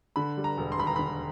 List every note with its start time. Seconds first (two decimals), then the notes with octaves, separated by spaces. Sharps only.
0.16 D3 B5
0.37 G3
0.44 A#5
0.57 E1
0.72 C6
0.79 D#2 B5
0.87 A#5
0.96 D3 B5